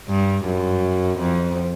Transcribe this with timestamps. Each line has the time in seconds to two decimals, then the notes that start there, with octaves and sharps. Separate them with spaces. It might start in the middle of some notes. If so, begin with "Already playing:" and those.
0.08 G2
0.45 F#2
1.19 F2